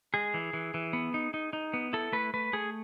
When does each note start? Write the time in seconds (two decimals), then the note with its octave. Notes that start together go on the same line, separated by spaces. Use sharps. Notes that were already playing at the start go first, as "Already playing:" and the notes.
0.14 G#3 G#4
0.34 E3
0.53 E3
0.74 E3
0.93 B3
1.14 D#4
1.34 D#4
1.53 D#4
1.74 B3
1.93 E4 A4
2.12 A3 B4
2.34 A3 B4
2.53 A3 G#4